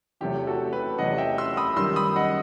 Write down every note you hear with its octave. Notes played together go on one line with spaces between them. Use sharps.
E2 C3 F#3 A3 G4
F#4 A4
G4 B4
E2 C3 F#3 A3 D#5 F#5
E5 G5
C6 E6
B5 D#6
F#2 D#3 G3 C6 E6
B5 D#6
D#5 F#5